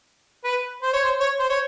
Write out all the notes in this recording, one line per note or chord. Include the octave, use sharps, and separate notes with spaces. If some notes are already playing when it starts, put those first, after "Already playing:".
B4
C5
C#5
C5
C#5
C5
C#5